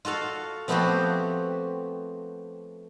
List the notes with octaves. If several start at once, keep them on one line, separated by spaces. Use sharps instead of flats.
F4 F#4 A4 F5
F3 A3 B3 C4 F#4 G4